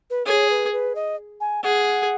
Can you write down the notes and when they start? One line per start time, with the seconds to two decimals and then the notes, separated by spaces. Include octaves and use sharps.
0.10 B4
0.26 G#4 C#5
0.50 B4
0.73 B4
0.95 D#5
1.41 G#5
1.64 G#4 F#5